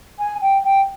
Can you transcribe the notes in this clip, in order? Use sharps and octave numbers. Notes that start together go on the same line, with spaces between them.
G#5
G5
G5